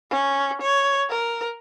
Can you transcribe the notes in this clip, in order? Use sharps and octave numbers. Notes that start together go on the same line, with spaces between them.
C#4
C#5
A#4